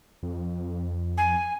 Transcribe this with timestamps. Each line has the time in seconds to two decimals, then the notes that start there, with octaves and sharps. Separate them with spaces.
0.23 F2
1.17 G#5